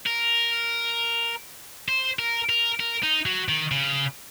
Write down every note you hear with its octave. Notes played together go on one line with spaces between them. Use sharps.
A#4
C5
A#4
A#4
A#4
D#4
F#3
D#3
C#3